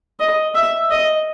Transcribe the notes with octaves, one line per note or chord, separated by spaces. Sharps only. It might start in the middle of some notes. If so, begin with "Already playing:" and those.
D#5
E5
D#5